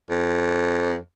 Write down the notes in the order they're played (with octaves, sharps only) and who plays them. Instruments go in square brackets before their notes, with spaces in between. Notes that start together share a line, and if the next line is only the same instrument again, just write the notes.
[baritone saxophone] F2